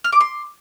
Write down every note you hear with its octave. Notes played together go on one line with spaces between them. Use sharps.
F6
D6
C6